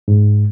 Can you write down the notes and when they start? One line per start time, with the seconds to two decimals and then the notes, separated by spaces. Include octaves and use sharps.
0.08 G#2